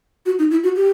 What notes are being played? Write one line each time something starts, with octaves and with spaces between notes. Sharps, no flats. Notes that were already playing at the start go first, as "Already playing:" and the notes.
F#4
D#4
E4
F#4
G4